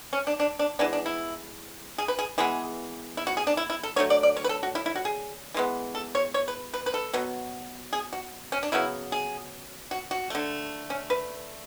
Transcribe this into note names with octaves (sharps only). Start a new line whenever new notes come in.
C#4
D4
D4
D4
E3 G#3 B3 D4
D4
E4
G#4
B4
G#4
E3 G#3 B3 G#4
E4
F#4
G#4
D4
E4
E4
A4
D3 F#3 A3 C#5
D5
D5
C#5
B4
A4
F#4
E4
E4
F#4
G#4
E3 G#3 B3
A4
C#5
C#5
B4
B4
B4
A4
B2 F#3 B3
G#4
F#4
C#4
D4
C#3 F#3 B3 E4
G#4
F#4
F#4
D3 A3
C#4
B4